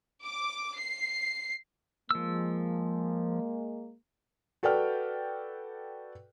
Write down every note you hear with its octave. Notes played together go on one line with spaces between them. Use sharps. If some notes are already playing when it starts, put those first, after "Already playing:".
D6
C7
F3 G#3 A#3 E6
F#4 A4 B4 D5 G5 F6